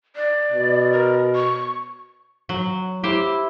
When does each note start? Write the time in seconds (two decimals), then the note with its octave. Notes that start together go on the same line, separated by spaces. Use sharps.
0.16 D5
0.52 B2
0.93 A#4
1.35 C#6
2.49 F#3
3.04 E4 G4 C5